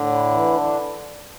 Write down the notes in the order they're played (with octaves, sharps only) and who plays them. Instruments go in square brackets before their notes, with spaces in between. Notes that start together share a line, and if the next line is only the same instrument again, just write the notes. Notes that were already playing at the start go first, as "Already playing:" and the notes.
Already playing: [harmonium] A2 [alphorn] D3
[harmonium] E4
E3
D4